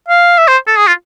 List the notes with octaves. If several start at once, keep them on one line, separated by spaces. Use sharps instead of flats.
F5
E5
C5
A4
G#4
F4